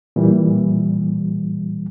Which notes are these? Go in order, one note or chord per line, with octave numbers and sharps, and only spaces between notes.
A#2 E3 G3